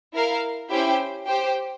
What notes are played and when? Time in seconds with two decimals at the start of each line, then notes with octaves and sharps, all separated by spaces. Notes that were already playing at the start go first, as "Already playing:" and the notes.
0.14 E4 A#4 F5
0.70 C#4 E4 G4 C5 G5
1.28 G4 C5 G5